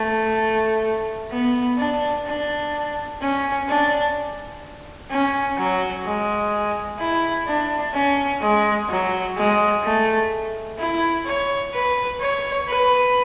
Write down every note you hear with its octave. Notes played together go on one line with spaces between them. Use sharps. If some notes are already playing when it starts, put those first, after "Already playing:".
Already playing: A3
B3
D4
D4
C#4
D4
C#4
F#3
G#3
E4
D4
C#4
G#3
F#3
G#3
A3
E4
C#5
B4
C#5
B4